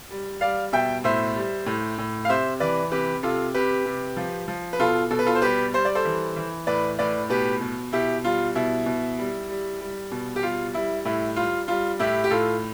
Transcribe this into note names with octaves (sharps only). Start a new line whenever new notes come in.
G3
G3 D5 F5
B2 E5 G5
A2 C5 E5
G3
A2
A2
F5
C3 C5 E5
E3 B4 D5
C3 G4 B4
C3 F4 A4
C3 G4 B4
C3
F3
F3
B4
B2 F4 A4
B2 A4
B4
F4 A4
C5
G3 G4 B4
G3 C5
D5
A4 C5
E3
E3
A2 B4 D5
A2 B4 D5
B2 G4 B4
B2
B2 E4 G4
G3 F4
B2 E4
B2
G3
G3
G3
B2
G4
G3 F4
G3 E4
A2 E4
G3 F4
G3 F4
A2 E4 G4
G4
A2 F4 A4